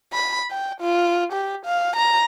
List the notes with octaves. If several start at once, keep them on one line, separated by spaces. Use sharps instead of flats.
B5
G5
F4
G4
F5
A#5